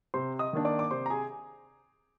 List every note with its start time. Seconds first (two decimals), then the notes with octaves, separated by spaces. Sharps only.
0.14 C3 C5 C6
0.39 D#5 D#6
0.53 D#3 A#3 D4
0.65 D5 D6
0.79 D6
0.90 C3 C5 C6
1.06 A#5
1.10 G#4 G#5